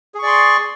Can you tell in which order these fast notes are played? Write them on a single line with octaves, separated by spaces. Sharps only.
G#4 C#6 D5 C6